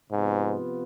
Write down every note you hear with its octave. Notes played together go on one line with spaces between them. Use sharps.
G#2 C3 F3 B3 F4